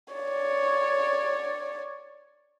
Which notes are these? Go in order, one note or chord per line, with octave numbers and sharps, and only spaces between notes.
C#5 D5